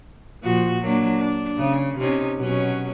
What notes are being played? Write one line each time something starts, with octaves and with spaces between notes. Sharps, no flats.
A#2 F3 F#4
F#3 A#3 D4
D4
C#3
C3 C#4 D#4
B2 F#3 C#4